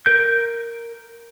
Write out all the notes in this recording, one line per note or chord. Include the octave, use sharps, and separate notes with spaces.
A#4 G6